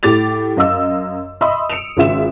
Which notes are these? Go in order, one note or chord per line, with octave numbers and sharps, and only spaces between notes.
A2 G4 D6 A6 F7
F#2 D#5 F5 E6
D#5 E5 B5 C6 D#6 E6
C#7 D7 E7 F7
G#1 C#3 F4 E5 E7